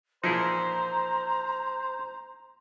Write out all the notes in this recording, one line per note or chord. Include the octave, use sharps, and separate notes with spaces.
A#2 E3 F3 D#4 E4 G#4 C5 A#5